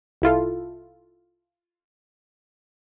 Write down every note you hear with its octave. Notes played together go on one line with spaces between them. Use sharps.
C2 E4 F4 A4